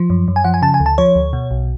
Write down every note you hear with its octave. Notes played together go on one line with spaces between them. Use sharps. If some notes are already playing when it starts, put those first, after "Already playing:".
Already playing: F3
F#2
F#2
G#5
F3 F#5
G#5
C#3 A5
G#5
D2
A5
F3 C#5
D2
B2
B1